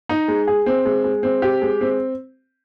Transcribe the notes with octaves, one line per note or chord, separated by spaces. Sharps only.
D#4
G#3
G#4
C4
G#3
G#3
C4
G4
G#3
C4